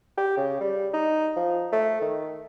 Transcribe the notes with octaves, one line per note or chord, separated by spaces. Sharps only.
G4
C#3
G3
D#4
F3
A3
D#3